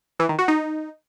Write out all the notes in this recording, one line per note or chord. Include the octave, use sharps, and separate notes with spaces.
E3
D#3
F#4
D#4